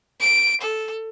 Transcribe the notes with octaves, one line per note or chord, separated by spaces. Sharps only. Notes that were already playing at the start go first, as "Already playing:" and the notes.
D7
A4